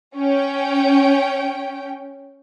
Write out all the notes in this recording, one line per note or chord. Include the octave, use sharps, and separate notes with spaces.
C#4 G5